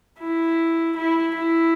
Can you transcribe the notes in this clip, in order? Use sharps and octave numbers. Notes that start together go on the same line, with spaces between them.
E4
E4
E4